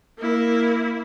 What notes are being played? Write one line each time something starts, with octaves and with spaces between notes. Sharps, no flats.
A#3 E4